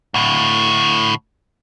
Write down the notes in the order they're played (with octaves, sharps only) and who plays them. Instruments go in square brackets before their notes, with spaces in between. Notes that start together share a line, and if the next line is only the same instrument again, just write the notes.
[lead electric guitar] D2 A2